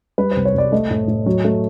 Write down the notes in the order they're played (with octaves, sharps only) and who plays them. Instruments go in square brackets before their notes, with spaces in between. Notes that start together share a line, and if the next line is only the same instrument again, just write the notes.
[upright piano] G3 B4
C5
C2
C#5
C2 D5
A3 D#5
A2
A2
F#3
A3